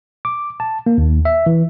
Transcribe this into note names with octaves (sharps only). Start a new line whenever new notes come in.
D6
A5
A#3
D#2
E5
E3